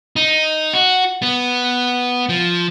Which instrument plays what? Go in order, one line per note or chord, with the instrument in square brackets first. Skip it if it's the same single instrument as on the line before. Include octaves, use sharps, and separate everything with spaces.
[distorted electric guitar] D#4
F#4
B3
F3